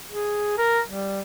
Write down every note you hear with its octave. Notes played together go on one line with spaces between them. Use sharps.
G#4
A#4
G3